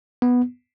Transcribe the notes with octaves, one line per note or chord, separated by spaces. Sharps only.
B3